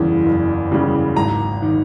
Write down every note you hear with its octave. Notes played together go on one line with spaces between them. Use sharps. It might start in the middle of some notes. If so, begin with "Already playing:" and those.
Already playing: F#1 E2 C#3 E3 G3
F#1
E2 C#3 E3 G3
G#1 A#5
D#3